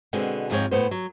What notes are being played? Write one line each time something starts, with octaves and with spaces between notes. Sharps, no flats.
B2 D3 G#3 C4
D#2 G#2 F3 G#3 C4 C#5
A2 B3 C5
F#3